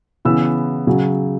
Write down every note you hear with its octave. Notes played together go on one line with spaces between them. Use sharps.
C#3 E3 B3 E6
C#3 F#3